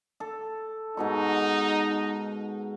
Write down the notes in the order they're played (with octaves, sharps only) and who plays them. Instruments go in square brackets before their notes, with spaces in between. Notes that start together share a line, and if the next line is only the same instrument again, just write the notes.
[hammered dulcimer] A4
[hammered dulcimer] G#2 B2 C#6 [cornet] D#4